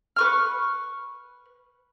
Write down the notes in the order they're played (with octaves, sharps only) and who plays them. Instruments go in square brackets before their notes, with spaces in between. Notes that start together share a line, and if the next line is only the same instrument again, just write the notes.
[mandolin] B4 C#6 F6